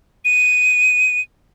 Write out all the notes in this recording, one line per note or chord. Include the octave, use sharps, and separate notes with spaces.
D#7